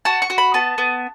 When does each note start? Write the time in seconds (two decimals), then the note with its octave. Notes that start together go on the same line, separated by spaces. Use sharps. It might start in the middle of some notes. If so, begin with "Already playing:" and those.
0.05 F#4 A5
0.22 C#6
0.30 F#4
0.38 B5
0.54 B3 A5
0.78 B3